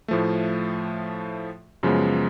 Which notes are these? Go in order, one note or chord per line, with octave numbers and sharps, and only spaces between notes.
A2 F3 A3
F#2 C#3 F3 G#3 B3